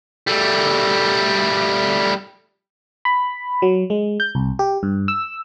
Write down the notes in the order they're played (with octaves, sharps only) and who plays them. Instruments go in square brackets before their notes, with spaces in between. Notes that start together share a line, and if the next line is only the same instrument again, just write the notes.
[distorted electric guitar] G3 A3
[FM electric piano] B5
F#3
G#3
G6
C2
G4
G2
E6